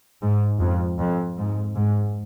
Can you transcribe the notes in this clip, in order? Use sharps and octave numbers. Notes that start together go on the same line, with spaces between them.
G#2
F2
F2
G#2
G#2